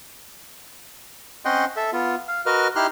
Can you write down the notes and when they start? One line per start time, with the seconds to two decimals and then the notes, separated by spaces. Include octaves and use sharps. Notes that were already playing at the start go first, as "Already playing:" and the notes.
1.45 C4 C#4 D#5 F#5 G5 C6
1.77 A4 E5
1.93 B3 F4
2.28 F5
2.46 F#4 A#4 B4 D#5 F6
2.76 D#4 E4 G4 C6 F6 F#6